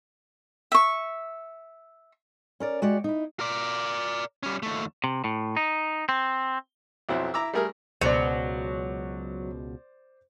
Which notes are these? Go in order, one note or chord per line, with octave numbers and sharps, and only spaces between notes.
E5 C#6
C#4 A#4 D5
G#3 F#4 G4 D5
D#4 E4
A#4 D5
G3 C#4
D#2 A3
C3
A2
D#4
C4
B1 F2 F#3 C4 E4
E4 A#5 D6 E6
G3 A3 G#4 A#4
C#2 B2 F#3 C5 D5